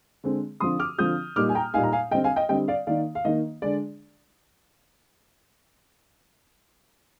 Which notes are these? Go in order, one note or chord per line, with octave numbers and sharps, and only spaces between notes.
D3 G#3 C4
D3 F3 C4 F4 C6 D#6
D6 F6
D3 F3 C4 F4 D#6 G6
A#2 G3 A#3 D#4 D6 F6
G#5
G5 A#5
A#2 G3 A#3 D#4 F5 G#5
A#5
F5 G#5
D3 G3 C4 D#5 G5
F5 G#5
D#5 G5
D3 G3 C4 D#5 G5
D5 F5
D#3 A#3 D#4 D5 F5
F5
D#3 A#3 D#4 D#5
D3 G#3 D4 D5